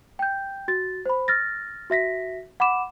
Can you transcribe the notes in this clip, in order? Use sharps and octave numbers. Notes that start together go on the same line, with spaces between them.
G5 G6
F#4 A6
C5 B5
F6 A6 A#6
F#4 E5 A#6 B6
F#5 B5 D6 E7